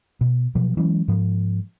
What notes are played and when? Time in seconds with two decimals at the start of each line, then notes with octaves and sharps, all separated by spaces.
0.21 B2
0.55 B2 F3 F#3
0.77 E3 F#3 G#3 C#4
1.08 G#2 F3